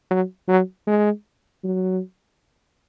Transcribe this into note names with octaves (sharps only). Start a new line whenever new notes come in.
F#3
F#3
G#3
F#3